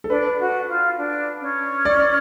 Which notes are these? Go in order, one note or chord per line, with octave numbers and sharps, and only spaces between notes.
A4
D4 B4
F#4
F4
D4
C#4
D5